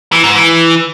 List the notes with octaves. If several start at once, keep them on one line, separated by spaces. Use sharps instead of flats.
E3
G#2
E3